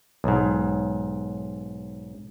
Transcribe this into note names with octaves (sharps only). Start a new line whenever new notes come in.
B1 G#2